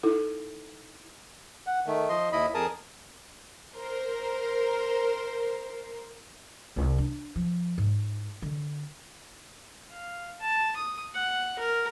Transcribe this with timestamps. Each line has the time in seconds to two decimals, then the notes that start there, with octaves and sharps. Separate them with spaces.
0.03 D#4 E4 A4
1.67 F#5
1.87 D#3 A3
2.09 F3 D#5 C6
2.32 D#2 E4 D#5 B5
2.54 F2 G#4 A#4 A5 D#6
3.75 A#4 C5
6.76 C2
6.98 D4
7.36 F3
7.78 G#2
8.42 D3
9.91 F5
10.40 A5
10.76 D#6
11.14 F#5
11.59 A#4